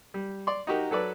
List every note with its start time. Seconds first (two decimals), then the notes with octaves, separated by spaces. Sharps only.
0.14 G3
0.47 D5 C6
0.67 D#4 F#4 G4 A#4
0.91 F#3 A4 B4 D5